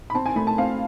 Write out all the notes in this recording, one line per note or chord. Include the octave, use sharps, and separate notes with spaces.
B5
C4 A5
G#5
A3 B5
A5
C4 F5